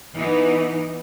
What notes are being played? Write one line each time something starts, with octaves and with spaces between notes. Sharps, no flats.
E3 B3 D#4